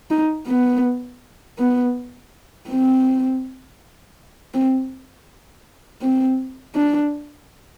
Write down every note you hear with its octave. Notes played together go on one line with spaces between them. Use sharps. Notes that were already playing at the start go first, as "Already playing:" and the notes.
D#4
B3
B3
C4
C4
C4
D4